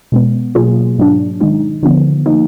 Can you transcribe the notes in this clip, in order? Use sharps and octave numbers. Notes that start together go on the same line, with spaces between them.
B2 G#3 B3
B2 F#3 A#3 F4 G#4
G#2 F#3 D4
D#3 G#3 D#4
D3 F3 B3
F3 A#3 D#4